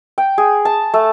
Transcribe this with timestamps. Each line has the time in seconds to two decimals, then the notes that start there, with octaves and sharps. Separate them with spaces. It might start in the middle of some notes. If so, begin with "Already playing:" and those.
0.18 G5
0.38 G#4
0.65 A5
0.94 A3